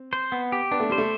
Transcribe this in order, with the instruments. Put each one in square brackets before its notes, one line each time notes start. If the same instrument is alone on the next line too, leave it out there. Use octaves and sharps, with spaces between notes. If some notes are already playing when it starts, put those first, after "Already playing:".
Already playing: [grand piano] C4
[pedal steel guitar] C5
B3
G4
[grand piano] B3 [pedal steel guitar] D4
[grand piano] A3
[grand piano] G3 [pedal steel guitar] C5
[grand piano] A3